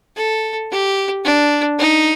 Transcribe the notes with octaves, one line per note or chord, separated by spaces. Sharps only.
A4
G4
D4
D#4